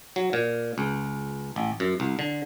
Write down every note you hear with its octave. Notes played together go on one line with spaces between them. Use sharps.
F#3
A#2
C#2
A1
F#2
C2
D3